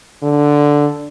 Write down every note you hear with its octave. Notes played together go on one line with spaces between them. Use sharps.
D3